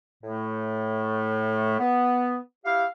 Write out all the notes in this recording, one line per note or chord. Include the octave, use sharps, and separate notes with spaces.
A2 A3
B3
E4 G4 F5